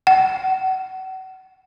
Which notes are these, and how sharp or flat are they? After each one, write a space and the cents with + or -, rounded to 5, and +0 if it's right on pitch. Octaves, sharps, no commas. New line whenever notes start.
F#5 +35